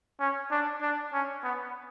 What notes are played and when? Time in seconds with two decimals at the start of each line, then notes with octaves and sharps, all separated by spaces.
0.20 C#4
0.51 D4
0.81 D4
1.13 C#4
1.43 B3